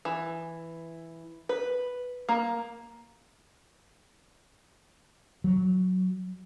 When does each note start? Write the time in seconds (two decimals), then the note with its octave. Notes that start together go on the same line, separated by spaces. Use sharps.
0.05 E3
1.49 B4
2.29 A#3
5.44 F#3